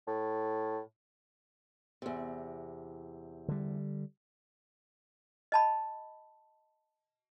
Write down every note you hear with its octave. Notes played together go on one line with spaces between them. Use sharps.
A2
E2 C3
D3 G3
D#5 A5 B5